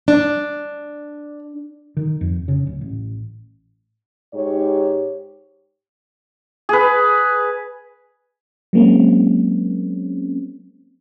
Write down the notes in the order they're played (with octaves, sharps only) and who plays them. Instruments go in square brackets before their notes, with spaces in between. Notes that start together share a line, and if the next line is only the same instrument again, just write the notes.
[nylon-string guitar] D4
[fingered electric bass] D#3
F2
C#3
D1
A1
[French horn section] G#2 G4 C#5
[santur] G#4 B4
[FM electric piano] F#3 G#3 A#3 C4 C#4